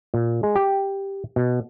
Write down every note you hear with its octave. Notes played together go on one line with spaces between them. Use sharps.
A#2
G#3
G4
B2